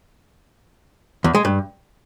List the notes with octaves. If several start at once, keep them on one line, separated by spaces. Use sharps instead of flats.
E2
G#3
G2